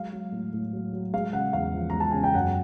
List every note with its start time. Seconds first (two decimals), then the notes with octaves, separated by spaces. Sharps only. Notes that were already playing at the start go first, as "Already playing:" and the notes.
Already playing: F#3 G#3 F5
0.12 F#3
0.32 A2
0.53 A2
0.73 F#3
0.93 F#3
1.14 G#3 F5
1.33 C#3 F#5
1.53 E2 F5
1.74 F3
1.90 G#3 A#5
2.00 A5
2.11 C#3 G#5
2.24 G5
2.34 F#2 F#5